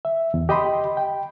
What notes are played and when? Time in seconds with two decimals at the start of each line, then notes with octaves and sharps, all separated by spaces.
0.05 E5
0.34 E2
0.49 G4 D#5 G5 B5 C6
0.97 G5